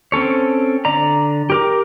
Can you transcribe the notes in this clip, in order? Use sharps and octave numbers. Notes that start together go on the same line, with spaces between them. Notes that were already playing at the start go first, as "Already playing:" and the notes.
C4 C#4 A4 C#5
D3 D5 A#5
G4 A#4 D6